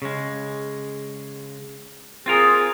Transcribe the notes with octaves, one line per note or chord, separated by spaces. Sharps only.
C#3 G#3
C4 F4 G#4 A#4